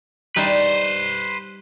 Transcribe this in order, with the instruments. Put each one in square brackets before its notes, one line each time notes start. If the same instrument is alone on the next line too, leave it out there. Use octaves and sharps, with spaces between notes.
[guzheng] G3 D#4 [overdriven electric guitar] B4 C5